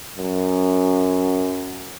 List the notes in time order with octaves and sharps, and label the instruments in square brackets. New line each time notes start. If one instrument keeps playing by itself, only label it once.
[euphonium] F#2